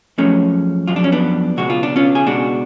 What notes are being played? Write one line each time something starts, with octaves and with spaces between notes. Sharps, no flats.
F#2 F3 G#3 A3 C#4
F#2 F3 G#3 F4
D4
C#4
B3 D4
C#2 B2 G#3 F#4
F4
D4
C#4 F4
G#4
C#2 B2 G#3 D4 F#4